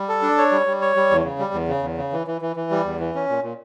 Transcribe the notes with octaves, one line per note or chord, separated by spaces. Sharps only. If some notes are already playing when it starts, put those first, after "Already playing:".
Already playing: G3
A4
D4
C#5
G3
G3
C#5
G3
E2
C#3
G3
E2
C#3
E2
C#3
E3
E3
E3
E3
G3
E2
E3
C#4
A#2
A#2